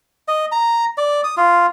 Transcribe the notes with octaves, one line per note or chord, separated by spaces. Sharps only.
D#5
A#5
D5
D#6
F4